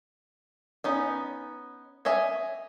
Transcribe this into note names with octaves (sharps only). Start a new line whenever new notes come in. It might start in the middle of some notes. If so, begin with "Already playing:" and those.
B3 C#4 D#4
C#5 D#5 E5 G#5